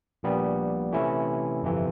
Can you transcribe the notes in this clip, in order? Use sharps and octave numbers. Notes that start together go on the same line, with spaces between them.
A#1 A#2 G3 B3
C3 E3 A3 C#4 E4
G1 F2 C3 E3